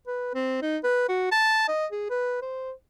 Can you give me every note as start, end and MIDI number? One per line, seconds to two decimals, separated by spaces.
0.07 0.30 71
0.34 0.58 60
0.62 0.77 63
0.84 1.04 71
1.09 1.30 66
1.32 1.65 81
1.68 1.86 75
1.92 2.08 68
2.10 2.39 71
2.42 2.72 72